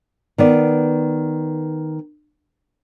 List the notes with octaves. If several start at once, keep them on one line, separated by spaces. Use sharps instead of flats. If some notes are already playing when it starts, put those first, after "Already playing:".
D#3 B3 D5